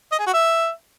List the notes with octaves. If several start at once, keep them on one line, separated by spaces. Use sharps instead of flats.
D#5
G#4
F#4
E5